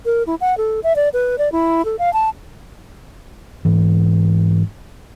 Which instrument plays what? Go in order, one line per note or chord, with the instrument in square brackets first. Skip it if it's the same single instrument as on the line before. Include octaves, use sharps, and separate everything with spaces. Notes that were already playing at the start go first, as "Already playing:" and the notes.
[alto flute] A#4
E4
F#5
A4
E5
D5
B4
D5
E4
A4
F5
A5
[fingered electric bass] G#2 E3